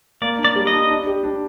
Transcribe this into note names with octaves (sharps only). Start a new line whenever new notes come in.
A#3 D5
D4
D5
G3
D#5
D4
D4
G4
D4